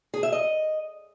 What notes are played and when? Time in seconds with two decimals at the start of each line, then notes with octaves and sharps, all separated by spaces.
0.14 G#4
0.23 E5
0.32 D#5